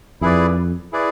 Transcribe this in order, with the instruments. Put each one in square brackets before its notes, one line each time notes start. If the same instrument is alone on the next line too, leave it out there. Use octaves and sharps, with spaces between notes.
[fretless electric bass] F2 [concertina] E4 G#4 B4 D5
[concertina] E4 G#4 B4 D5